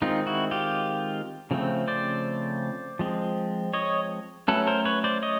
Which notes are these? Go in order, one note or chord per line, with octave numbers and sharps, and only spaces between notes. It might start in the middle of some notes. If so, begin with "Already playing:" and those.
D#3 G#3 C4 D#4 F4
E4 F#4
F4 G4
C#3 F3 A3 C4
C5 D5
F3 G#3 C4
C#5 D#5
F#3 A3 C#4 A4 B4
A#4 C5
B4 C#5
C5 D5
C#5 D#5